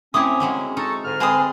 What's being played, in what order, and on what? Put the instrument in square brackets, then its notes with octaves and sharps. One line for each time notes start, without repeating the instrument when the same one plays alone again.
[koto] A3 C4 [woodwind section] C#4 [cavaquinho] E4 D6 D#6
[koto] F#3 G#3 A#3
[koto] D#4 [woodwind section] A4 C#6
[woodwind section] G#2 D3 F6
[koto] G#3 C4 C5 [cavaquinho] B4 G#5 D#6